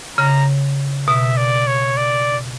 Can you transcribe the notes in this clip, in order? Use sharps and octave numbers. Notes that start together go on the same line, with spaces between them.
C#3 A#5
B2 E5
D5
C#5
D5